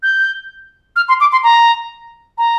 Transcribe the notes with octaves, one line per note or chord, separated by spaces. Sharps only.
G6
F6
C6
D6
C6
A#5
A#5